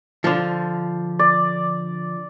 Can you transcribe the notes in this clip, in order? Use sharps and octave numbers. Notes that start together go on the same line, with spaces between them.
D3 F3
D5